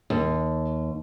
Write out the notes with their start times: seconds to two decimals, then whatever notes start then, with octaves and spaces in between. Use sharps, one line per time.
0.10 D#2